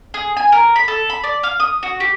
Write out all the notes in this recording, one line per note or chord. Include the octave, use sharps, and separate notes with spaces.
G#4
G#5
A#4
B5
A4
B5
D5
F5
D#6
F#4
G4